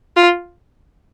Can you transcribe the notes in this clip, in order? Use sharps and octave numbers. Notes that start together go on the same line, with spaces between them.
F4